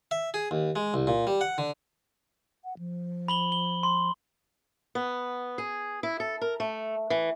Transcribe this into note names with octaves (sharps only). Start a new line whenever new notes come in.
E5
G#4
D#2
G#3
C2
A#2
G3
F#5
D3
F#5
F3
B5 F#7 G7
G7
C6
B3
G#4
E4
A4
A#4
A3
E3